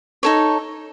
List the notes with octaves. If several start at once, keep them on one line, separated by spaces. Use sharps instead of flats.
D#4 A4 C#5